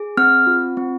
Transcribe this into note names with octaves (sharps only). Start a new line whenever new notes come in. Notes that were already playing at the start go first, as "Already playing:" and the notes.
Already playing: G#4
C4 F6
F4
C4